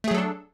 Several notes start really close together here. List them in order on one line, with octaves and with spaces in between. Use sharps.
A3 G#4 F#3 A4 D4